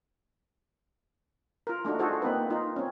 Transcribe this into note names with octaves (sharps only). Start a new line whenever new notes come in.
F4 A#4
A3 D4 D#4 F#4
F4 F#4 G#4 A4 C5
A#3 C4 D#4 B4
D#4 F4
C4 C#4